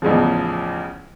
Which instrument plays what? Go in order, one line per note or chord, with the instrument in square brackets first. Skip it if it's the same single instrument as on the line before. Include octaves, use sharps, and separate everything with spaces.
[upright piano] A1 E2 C#3 F3